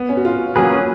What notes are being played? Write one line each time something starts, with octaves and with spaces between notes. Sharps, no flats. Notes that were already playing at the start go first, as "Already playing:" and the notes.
Already playing: B3
C#4
F#4
F4
F#3 A#3 C#4 F#4 G#4 B4